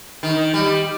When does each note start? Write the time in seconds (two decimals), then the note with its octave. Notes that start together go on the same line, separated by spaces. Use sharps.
0.23 D#3
0.54 G3